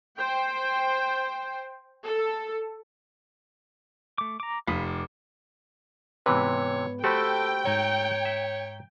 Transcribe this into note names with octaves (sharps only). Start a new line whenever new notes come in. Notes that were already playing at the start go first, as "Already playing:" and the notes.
C5 G5
A4
A3 D6
A#5 D6
F1 F5 B5 D#6
D6
G#2 C3 E3 B3 B4 C#5
A3 F#4 G4 A4 C5 G5 B5
G#2 C#5 A#5 G#6
E5